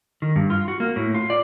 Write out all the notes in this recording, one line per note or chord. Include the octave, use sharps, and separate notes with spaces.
D#3
G2
F4
F#4
A#3
A2
F4
D5